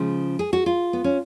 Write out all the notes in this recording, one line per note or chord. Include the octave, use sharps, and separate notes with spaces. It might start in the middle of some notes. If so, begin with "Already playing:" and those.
Already playing: C#3 F3 G#3
G#4
F#4
F4
B3
C#4